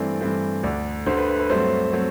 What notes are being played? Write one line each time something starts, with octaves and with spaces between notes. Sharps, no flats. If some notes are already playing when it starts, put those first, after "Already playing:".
Already playing: G2 E3 A3 C4 D5
G2 E3 A3 C4
D2 D3 A3 D5
D2 D3 A3 C5
B4
B4
B4
G2 F#3 A3 C4 C5
F#3 A3 C4